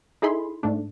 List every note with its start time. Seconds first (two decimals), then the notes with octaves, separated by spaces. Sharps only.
0.22 D#4 E4 G#4 A4 B5 C6
0.63 G#2 A3 D4